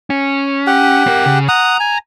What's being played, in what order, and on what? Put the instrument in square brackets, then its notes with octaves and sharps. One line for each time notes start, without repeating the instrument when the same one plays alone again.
[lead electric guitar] C#4
[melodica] G4 F#5
[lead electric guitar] C4 A#4
C#3
[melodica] F#5 D#6 [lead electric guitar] A#5
[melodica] G#5